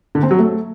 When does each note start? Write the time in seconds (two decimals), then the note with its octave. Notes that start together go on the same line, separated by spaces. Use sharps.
0.15 D3
0.23 C4
0.31 F#3
0.38 A3